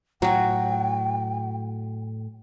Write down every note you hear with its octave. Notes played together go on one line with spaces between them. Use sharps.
A2 F#3 F#4 G5